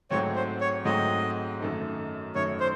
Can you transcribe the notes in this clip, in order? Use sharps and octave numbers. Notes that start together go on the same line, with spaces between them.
G#2 F#3 A3 C4 C#5
C5
C#5
G#2 F#3 A3 C4 D#5
F#2 D#3 A3 D#4
F#2 D#3 A3 D#4 C#5
C5